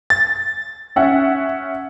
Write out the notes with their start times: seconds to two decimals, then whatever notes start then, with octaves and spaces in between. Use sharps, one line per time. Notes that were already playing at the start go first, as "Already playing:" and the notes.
0.10 A6
0.96 C#4 E5 F#5